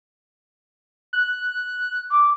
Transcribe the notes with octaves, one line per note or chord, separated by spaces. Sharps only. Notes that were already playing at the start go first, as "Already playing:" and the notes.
F#6
D6